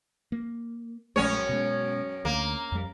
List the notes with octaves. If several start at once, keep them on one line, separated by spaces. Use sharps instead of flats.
A#3
A#1 F#2 G#3 A3 C#4 C#5
B2 G#3
D2 A#3
F2 G3